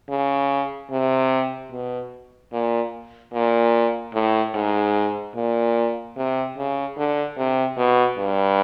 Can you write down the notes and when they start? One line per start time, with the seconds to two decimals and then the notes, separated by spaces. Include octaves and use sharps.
0.09 C#3
0.91 C3
1.71 B2
2.53 A#2
3.34 A#2
4.14 A2
4.55 G#2
5.36 A#2
6.17 C3
6.57 C#3
6.97 D3
7.37 C3
7.77 B2
8.18 G2